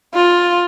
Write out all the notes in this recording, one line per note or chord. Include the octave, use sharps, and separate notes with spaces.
F4